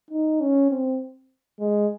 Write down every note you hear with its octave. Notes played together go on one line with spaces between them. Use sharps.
D#4
C#4
C4
G#3